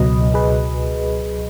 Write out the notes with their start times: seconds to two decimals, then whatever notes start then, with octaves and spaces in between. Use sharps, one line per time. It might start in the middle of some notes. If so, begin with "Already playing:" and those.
Already playing: C#2 B2 F#3 B4 D#5
0.34 G#4 B4